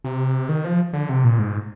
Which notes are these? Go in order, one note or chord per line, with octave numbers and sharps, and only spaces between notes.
C3
D#3
F3
D3
C3
A#2
G#2